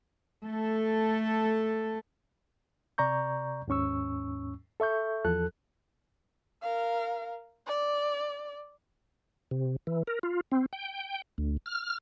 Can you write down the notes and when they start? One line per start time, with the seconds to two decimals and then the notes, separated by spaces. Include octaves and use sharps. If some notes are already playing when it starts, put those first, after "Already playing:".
0.46 A3 A4
2.98 C3 D5 A#5 C#6 G6
3.68 D#2 G#2 C#4 C#6 E6
4.80 A4 E5 C#6 G6
5.25 E2 F3 A4 F#6
6.62 A#4 F5
7.67 D5
9.51 C3
9.87 E3
10.07 A#4
10.23 F4
10.52 C4
10.73 G5
11.38 D2
11.66 F6